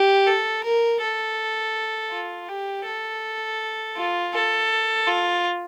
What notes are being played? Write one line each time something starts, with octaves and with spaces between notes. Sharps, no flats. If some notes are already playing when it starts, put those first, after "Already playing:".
Already playing: G4
A4
A#4
A4
F4
G4
A4
F4
A4
F4